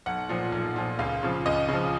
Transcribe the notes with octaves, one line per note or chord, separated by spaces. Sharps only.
B1 F#5
A#2 F3
B1
A#2 F3
C#2 F5
C#3 F3
C#2 D#5
C#3 F3